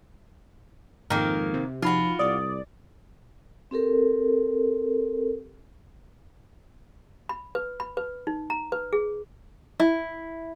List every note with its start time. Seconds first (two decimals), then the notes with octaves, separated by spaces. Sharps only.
1.10 F2 G#2 D#3 A#3
1.54 C3
1.82 F3 D#4 F4 F#4 B5
2.19 C2 D5 D#6
3.71 C4 G4 A4 A#4
7.29 B5
7.55 B4
7.80 B5
7.97 B4
8.27 D#4
8.50 A#5
8.72 B4
8.93 G#4
9.79 E4